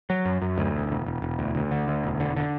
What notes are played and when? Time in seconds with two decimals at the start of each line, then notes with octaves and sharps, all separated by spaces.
0.10 F#3
0.25 F#2
0.42 F#2
0.58 D2
0.74 E1
0.90 E1
1.06 E1
1.22 E1
1.39 D2
1.55 D2
1.71 D3
1.88 D2
2.04 E1
2.20 D3
2.37 D3